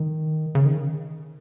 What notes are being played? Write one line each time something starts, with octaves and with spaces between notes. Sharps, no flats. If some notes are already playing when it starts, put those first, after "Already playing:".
Already playing: D#3
C#3
D#3